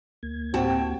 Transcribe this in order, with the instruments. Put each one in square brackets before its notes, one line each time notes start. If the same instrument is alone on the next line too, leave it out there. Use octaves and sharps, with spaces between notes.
[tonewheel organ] D2 A#3 G#6
[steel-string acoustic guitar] A2 G5 A5 [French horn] C4 [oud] F#4